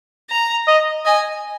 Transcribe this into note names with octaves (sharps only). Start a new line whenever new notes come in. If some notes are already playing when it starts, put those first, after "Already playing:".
A#5
D#5
D#5 G#5